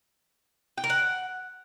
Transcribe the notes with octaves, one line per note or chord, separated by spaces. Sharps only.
G5
A#4
F#5